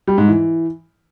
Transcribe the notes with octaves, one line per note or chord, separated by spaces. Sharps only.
G3
G#2
E3